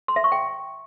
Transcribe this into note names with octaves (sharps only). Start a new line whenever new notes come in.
C6
E5
C#6
G5